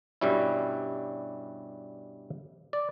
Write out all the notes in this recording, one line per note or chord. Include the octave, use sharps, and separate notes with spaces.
G2 B2 G3 C#4 E4
D5